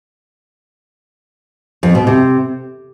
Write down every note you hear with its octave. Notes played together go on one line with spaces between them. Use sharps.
F2
B2
C3